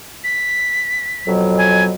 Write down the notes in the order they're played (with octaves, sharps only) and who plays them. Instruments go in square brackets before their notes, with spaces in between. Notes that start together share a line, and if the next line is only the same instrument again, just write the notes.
[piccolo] B6
[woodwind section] F2 B2 F#3
[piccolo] G#5